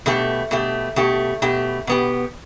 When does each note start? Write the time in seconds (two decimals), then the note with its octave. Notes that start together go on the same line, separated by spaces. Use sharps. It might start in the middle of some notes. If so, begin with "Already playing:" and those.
0.06 B2 A3 G4
0.51 B2 A3 G4
0.96 B2 A3 G4
1.42 B2 A3 G4
1.87 B2 B3 G4